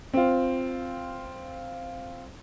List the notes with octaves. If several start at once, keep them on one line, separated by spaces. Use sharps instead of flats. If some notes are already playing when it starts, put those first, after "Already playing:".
C4 F4